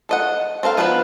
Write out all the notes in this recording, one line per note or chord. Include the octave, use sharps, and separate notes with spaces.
A4 D#5 F#5
C4 A4 A#4 F5
F3 B3 D4 F#4 B4